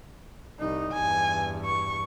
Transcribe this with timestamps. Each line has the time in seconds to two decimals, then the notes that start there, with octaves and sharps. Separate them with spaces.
0.59 C2 D#4
0.93 E2 G2 G#5
1.65 C#6